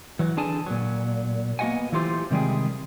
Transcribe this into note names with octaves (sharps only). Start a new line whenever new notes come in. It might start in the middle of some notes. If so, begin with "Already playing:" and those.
E3 F#3
D3 D4 G#4 G#5 A5
A#2 F#3
A#3 B3 F#4 D#5 F#5 G#5
E3 F#3 A3 F4 G4 C5
C3 D#3 G3 G#3 G#4